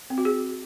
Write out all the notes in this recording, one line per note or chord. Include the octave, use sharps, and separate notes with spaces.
C4
F#4
G#4